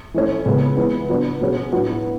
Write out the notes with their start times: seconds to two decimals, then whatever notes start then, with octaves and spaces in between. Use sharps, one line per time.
0.14 E3 A3 C#4
0.46 C#3 G#3 B3
0.77 E3 G#3 B3
1.09 F#3 B3 D4
1.41 B2 F#3 C#4 G#4
1.73 A2 F#3 B3 D4 F#4